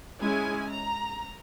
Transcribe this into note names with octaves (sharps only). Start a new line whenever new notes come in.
G#3 C#4 E4 G#5
A#5